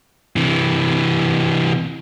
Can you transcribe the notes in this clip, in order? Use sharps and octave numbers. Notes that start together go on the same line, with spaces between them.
C3 E3